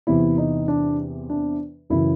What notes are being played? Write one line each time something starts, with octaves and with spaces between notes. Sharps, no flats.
E2 C3 E3 E4
D#4
D4
D4
F#2 C#3 E3 E4